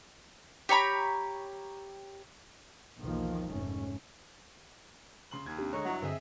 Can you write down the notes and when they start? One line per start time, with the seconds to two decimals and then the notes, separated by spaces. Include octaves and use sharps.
0.69 G4 C#5 A#5 B5
2.99 B1 E2 D#3 F3 A#3
3.48 F1 G#2 A3 C#4
5.31 C#3 C6 F#7
5.46 D#2 G#6
5.59 C4 D4 G4
5.73 D3 G#3 C#5 D#5 A#5 C#6
5.85 G2 F#3 E4 F#5
6.02 G2 D3 C4 G#4 D#5 E5